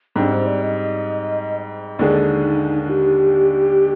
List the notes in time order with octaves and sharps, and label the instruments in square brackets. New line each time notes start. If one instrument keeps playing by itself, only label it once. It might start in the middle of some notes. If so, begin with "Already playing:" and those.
[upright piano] G#2 G3 C4 G4 [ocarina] D4
[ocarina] C5
D5
D#5
[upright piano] D#2 D3 G#3 D4 G#4 [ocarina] D#4
[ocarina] G4